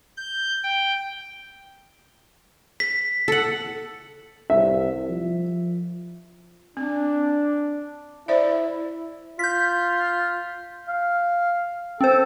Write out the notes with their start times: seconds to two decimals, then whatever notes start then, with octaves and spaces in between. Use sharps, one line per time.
0.17 G6
0.63 G5
2.80 B6
3.28 A4 F#5
4.50 C2 E5
5.09 F3
6.77 C4 D4
8.28 E4 C5 D5 E5
9.39 F4 G6 B6
10.88 F5
12.01 C4 A4 C5